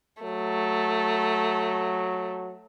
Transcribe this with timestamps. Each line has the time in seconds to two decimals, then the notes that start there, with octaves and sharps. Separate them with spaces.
0.23 F#3 A3